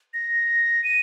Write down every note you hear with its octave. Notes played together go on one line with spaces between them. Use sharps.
A#6
D#7